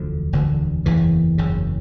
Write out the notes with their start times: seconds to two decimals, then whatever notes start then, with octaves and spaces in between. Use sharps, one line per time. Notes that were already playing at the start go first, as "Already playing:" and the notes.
Already playing: E1 D2 D3 F3
0.33 E1 D2 D3
0.86 F#1 E2 C#3 E3
1.38 F#1 E2 C#3